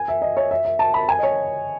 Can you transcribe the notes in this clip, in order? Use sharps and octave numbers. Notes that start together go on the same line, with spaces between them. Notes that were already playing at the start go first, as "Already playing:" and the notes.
Already playing: G#5
E5
D#5
C#5
E5
E5
A5
B5
G#5
D#5
C#5